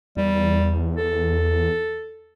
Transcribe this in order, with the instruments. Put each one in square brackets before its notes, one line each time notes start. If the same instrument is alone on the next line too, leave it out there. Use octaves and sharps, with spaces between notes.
[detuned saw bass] E2 [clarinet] G3
[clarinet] A4